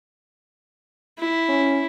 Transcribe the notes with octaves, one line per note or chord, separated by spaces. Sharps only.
E4
C#4